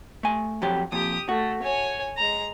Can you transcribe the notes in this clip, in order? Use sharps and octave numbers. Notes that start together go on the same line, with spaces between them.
A3 G#5
F2 F#3 G4
F2 A#2 G4 D#6
A3 F#4
C#5 G#5
G#3 A#5